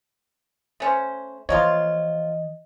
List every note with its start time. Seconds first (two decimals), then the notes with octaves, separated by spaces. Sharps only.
0.80 A3 C#4 C5
1.49 E3 F3 A#3 F4 C#5 D#5